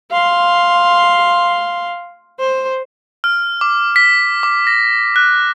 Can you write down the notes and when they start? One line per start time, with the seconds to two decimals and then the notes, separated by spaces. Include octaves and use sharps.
0.11 F5 C6
2.39 C5
3.24 F6
3.61 D6
3.96 B6
4.43 D6
4.67 A#6
5.16 F#6